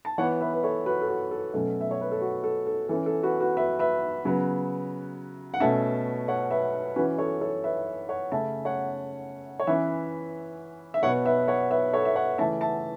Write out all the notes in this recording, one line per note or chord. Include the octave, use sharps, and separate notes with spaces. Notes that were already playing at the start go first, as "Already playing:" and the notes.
A5
E3 B3 C#5 F#5
B4 E5
B4
A4 C#5
F#4 B4
A4
F#4
A4
B2 F#3 A3 C#4 A4
E5
C#5
B4
A4
F#4
A4
A4
E3 C#4 A4
A4
F#4 B4
F#4 B4
B4 E5
B4 E5
C#3 F#3 B3
F#5
B2 A3 C#4 E5 A5
C#5 F#5
B4 E5
E3 C#4 F#4 B4
A4 C#5
A4 C#5
B4 E5
C#5 F#5
C#3 A3 C#4 E5 A5
C#5 F#5
C#5
E3 C#4 B4 E5
E5
B2 B3 C#5 F#5
B4 E5
C#5 F#5
B4 E5
A4 C#5
E5
C#5 F#5
C#3 E3 A3 C#4 E5 A5
E5 A5